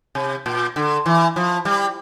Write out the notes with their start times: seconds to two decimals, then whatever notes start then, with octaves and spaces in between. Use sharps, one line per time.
0.15 C3
0.46 A#2
0.76 D3
1.06 E3
1.36 F3
1.65 G3